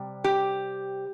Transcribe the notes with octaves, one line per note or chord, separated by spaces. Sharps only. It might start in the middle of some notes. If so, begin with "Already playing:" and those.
Already playing: C3 G3
G4